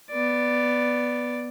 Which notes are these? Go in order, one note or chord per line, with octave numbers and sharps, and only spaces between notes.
B3 D5